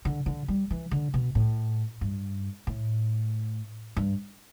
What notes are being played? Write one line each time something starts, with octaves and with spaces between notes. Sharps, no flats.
D3
D3
G3
E3
D3
B2
A2
G2
A2
G2